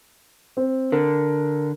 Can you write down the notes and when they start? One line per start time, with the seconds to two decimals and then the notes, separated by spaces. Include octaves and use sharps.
0.57 C4
0.92 D3 A#4